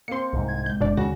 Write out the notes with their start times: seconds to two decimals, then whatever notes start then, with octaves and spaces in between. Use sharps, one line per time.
0.08 A#3 C4 C6 C#7
0.33 C2 G#2
0.48 G#6
0.66 G#3 G6
0.81 F#1 B2 D4 D5
0.97 D#2 C#3 F#4 A#6